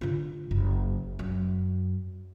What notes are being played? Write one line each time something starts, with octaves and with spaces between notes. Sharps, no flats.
D3 F4
F#1
F#2